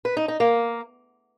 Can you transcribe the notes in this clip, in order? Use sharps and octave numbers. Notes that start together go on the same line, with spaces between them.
B4
D#4
D#4
A#3